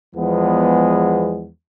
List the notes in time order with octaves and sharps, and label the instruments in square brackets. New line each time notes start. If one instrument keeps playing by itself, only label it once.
[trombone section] E2 F3 G#3 B3